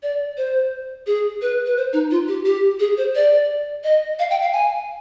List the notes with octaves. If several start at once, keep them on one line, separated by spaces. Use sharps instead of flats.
D5
C5
G#4
B4
B4
C5
D#4
F4
G4
G4
G#4
C5
D5
D#5
F5
G5
F5
G#5